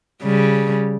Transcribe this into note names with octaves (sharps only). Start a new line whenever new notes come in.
C#3 G3